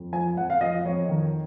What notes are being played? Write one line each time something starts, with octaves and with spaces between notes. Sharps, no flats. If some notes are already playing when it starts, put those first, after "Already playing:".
Already playing: F2
F3 G#5
F2 F#5
F5
F3 D#5
F2 C#5
D#3